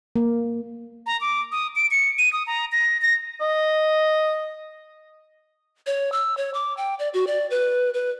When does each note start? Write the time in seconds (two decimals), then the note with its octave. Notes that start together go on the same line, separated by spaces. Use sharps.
0.16 A#3
1.06 A#5
1.21 D6
1.52 D#6
1.76 D7
1.91 C#7
2.18 D#7
2.33 D#6
2.47 A#5
2.72 A#6
3.02 A#6
3.41 D#5
5.87 C#5
6.12 E6
6.37 C#5
6.54 D6
6.77 G5
6.99 D5
7.14 F#4
7.27 D5
7.50 B4
7.94 B4